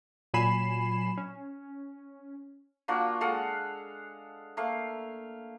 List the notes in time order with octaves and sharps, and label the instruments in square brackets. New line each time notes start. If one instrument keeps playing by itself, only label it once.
[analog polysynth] A#2 F#3 G#5 B5 C7 E7
C#4
[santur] A#3 D4 F4 F#4
G#3 A4 F5 F#5
A3 A#3 F5